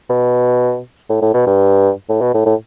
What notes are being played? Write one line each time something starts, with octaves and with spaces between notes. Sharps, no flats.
B2
A2
A2
B2
G2
A2
B2
A2
A2